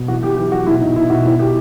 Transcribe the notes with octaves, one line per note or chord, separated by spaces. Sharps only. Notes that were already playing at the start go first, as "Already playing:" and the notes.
Already playing: B2
E3 F#4
E3 G4
E3 G4
E3 F#4
B2 E4
B2 D#4
B2 E4
B2 F#4
B2 E4
B2 G4